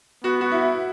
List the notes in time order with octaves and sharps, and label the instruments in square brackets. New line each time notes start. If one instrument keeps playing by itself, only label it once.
[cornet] B3 [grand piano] F#4
[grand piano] F#4
E4